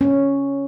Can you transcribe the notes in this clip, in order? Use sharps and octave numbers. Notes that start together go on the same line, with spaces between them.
C#4